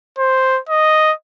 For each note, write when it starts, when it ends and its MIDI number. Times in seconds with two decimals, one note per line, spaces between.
0.18 0.59 72
0.69 1.12 75